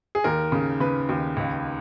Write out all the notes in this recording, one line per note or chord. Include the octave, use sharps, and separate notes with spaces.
G#4
D#2 A#4
C#3
C#3 B4
D#2
C#2